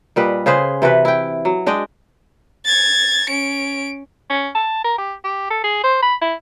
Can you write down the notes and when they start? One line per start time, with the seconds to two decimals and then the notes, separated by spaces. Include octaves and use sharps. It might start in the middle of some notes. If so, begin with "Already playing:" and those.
0.16 A#2 G3 B4 D#5
0.46 C#3 G#4 B4 C5
0.82 C3 E3 F#4 B4
1.05 E4 G5
1.45 F#3
1.66 G#3 D4 D#5 G5
2.65 G#6 A6
3.30 C#4 D7
4.30 C#4
4.55 A5
4.84 A#4
4.98 G4
5.24 G4
5.50 A4
5.64 G#4
5.84 C5
6.02 B5
6.22 E4